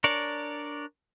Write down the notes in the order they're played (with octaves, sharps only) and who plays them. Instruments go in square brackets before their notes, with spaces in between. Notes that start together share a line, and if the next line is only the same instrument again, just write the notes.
[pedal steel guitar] D4 A#4 C#5 D5